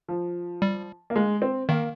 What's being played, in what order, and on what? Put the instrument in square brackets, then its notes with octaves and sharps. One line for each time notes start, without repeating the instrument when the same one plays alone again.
[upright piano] F3
[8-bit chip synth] G3
[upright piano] A#3
G#3
C4
[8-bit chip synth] D#3 [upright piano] A#3